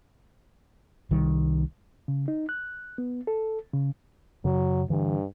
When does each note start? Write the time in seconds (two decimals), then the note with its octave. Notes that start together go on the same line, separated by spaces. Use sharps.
1.11 C2 D#3 G3
2.08 C#3
2.28 D#4
2.49 F#6
2.98 B3
3.27 A4
3.73 C#3
4.45 F#2 C#3 F#3
4.90 G2 D3 E3